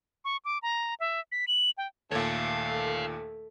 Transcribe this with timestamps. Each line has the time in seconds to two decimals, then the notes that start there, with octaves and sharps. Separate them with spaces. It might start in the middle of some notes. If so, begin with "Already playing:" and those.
0.25 C#6
0.45 D6
0.62 A#5
1.00 E5
1.32 B6
1.48 F#7
1.78 G5
2.11 D#2 A#2 A3 A4 C#5 F5